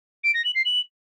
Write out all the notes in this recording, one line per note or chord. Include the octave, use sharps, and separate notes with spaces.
D7
A#6
F#7
C7
F#7